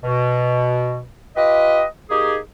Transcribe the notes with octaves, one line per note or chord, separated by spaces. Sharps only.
B2
F4 G4 B4 D#5
A#3 D#4 G4 G#4